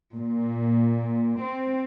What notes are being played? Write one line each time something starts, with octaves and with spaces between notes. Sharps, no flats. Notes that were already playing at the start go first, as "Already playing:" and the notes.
A#2
C4